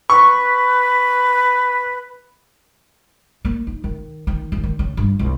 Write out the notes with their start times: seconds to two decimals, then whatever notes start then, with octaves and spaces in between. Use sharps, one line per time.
0.10 B4 C#6
3.45 A#3
3.67 D#4
3.84 D#3
4.27 D#3
4.52 D#2
4.63 D#3
4.79 C#3
4.97 G2
5.19 C2